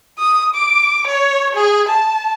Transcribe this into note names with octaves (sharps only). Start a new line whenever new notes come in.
D#6
D6
C#5
G#4
A5